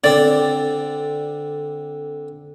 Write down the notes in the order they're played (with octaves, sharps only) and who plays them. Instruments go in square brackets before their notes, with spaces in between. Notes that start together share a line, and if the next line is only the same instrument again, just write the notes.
[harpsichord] D3 C4 [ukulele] D5